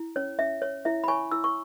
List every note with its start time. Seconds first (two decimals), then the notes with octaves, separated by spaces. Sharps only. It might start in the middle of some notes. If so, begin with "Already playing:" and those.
Already playing: E4
0.16 C#4 C#5
0.39 C#4 E5
0.62 C#5
0.85 E4 E5
1.04 B5
1.08 C#5 G#5 C#6
1.32 E4 E6
1.44 C#6